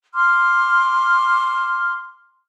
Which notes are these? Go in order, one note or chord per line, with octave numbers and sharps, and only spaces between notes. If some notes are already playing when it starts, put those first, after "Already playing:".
C6 D6 F6